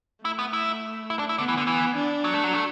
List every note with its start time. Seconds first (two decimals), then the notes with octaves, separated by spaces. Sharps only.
0.24 A3 E4
0.39 B3
0.53 E4
1.10 E4
1.19 D4
1.29 E4
1.38 D3 B3
1.48 E3
1.58 D3
1.67 E3
1.96 D4
2.24 F#3
2.34 A3
2.44 F#3
2.54 A3